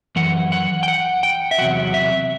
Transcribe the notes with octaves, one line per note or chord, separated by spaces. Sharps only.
F#2 E3 F#5
F#5
G5
F#5
G5
E5
E2 C3 F#3 F#5
E5